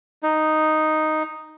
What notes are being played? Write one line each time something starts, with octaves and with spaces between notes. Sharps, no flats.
D#4